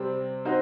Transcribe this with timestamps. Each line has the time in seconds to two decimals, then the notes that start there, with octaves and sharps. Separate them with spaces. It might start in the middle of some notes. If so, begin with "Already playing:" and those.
Already playing: C3 G3 C4
0.45 C4 D#4 F#4 C5